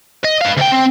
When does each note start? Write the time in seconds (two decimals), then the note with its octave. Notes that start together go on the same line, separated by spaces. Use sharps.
0.25 D#5
0.42 B4 F5
0.58 D2 G5
0.73 C4